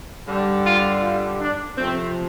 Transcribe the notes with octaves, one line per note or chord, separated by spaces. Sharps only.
G2 D3 G3
F4
F4
D4
C3 F3 A3 C4